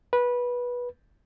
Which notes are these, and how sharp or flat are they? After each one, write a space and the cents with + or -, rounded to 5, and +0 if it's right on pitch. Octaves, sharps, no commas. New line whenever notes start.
B4 -15